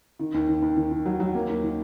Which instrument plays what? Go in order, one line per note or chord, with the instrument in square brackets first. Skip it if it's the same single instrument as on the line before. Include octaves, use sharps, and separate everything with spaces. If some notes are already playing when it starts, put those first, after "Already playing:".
[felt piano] D#3
D#2
D#3
D#2
D#3
D#3
F#3
F#3
A#3
D#2
D#3